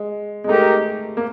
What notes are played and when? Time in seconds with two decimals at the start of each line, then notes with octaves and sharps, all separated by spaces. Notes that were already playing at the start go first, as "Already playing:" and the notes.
Already playing: G#3
0.44 G#3
0.48 A3 D#4 G4 A#4
1.17 A#3